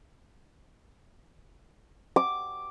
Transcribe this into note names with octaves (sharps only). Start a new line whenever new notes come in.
D6